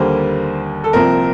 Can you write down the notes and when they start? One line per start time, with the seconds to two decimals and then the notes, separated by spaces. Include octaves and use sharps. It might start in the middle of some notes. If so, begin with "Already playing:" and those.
Already playing: D#2 D3 G3 A#3 C5
0.84 A4
0.93 C2 A#2 F3 C4 A#4